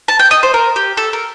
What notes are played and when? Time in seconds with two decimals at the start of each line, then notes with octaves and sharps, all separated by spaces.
0.08 A5
0.19 G5
0.31 D#5
0.43 C5
0.54 A#4
0.76 G4
0.97 A4
1.13 A#4